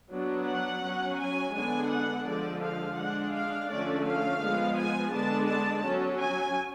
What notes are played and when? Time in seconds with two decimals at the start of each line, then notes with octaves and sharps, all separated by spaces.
0.12 F#3 B3 D4
0.47 F#5
0.83 F#3 C#4
1.20 G#5
1.55 D3 G#3 B3 D4 G#5
1.91 F#5
2.27 D3 F3 G#3 D5
2.62 F5
2.98 G#3 D4 F#5
3.34 F5
3.70 D3 F3 A3 C#4 D5
4.05 F5
4.42 F3 G#3 B3
4.77 G#5
5.13 D3 G#3 B3 D4 A5
5.49 A5
5.85 F#3 C#4
6.21 G#5